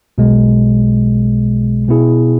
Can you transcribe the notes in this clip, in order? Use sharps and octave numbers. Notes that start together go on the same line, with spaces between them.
B1 B2 G#3
B2 B3 E4 G#4